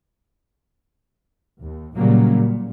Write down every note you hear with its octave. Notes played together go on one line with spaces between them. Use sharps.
D#2
A#2 C#3 F#3 G3 A#3
A#2